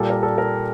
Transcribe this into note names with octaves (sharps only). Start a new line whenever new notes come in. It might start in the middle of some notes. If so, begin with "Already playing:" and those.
Already playing: A#2 G3 A#3 A4
A#4
A4
A#4